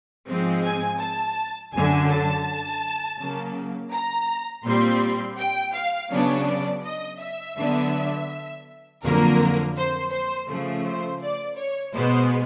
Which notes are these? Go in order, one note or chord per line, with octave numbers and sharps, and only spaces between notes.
G#2 F3 G#3 C4
G#5
A5
F#2 D3 F#3 G#5
A5
C#3 F#3 A#3
A#5
A#2 G3 C4 C6
G5
F5
C#3 F#3 B3 D4 C#5
D5
D#5
E5
D3 F#3 B3 D4
F2 D3 F#3 A#3 A#4
C5
C5
C#3 F3 A3
C5
D5
C#5
B2 G#3 B3 C5